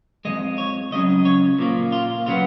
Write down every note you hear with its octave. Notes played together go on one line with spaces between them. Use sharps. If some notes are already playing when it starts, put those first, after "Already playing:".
F2 F3 G#3 D#5
C#5
C#2 C#3 F#3 C#4 D#5
C#5
A#2 F3 A#3
F4
C#3 F#3 B3 F4